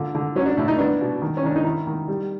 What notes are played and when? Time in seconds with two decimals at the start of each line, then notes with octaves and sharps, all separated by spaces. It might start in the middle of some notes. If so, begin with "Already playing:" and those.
Already playing: A#2 D3
0.15 D3
0.36 F#3 C#4
0.46 D4
0.57 A2 E4
0.68 D#4
0.79 B3 D4
1.01 B2
1.22 D#3
1.37 C#4
1.44 D#3 D4
1.56 D#4
1.64 D#3 E4
1.87 D#3
2.08 G3